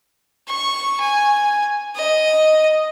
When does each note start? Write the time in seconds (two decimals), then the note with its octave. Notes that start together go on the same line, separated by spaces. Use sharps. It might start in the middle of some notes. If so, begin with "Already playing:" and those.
0.47 C#6
1.00 G#5
1.96 D#5